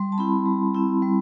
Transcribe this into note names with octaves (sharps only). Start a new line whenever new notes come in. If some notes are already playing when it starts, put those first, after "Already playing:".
Already playing: G3 C6
A5
C4 E4 B5
G3
C4 E4
G3